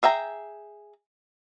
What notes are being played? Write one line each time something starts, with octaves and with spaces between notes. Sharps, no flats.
G#4 E5 G5 A#5